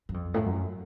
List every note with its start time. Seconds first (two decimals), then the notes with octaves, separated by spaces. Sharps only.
0.09 F#2
0.14 F2
0.34 A2
0.46 F#2